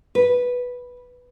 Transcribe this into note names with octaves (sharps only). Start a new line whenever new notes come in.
B4